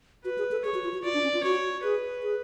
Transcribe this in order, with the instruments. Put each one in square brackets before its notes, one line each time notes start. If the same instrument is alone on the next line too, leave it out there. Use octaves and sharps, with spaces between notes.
[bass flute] F#4 [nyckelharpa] B4
[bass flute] G#4
A4
[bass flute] G#4 [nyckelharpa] C#5
[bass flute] F#4
F4
F#4
[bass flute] F4 [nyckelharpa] D5
[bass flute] D4
C#4
F4
[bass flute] F#4 [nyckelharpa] C#5
[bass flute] G#4 [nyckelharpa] B4
[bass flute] G#4